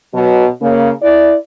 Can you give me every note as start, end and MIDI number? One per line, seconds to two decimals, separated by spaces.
0.14 0.47 47
0.14 0.47 54
0.62 0.90 49
0.62 0.90 58
1.03 1.35 64
1.03 1.35 74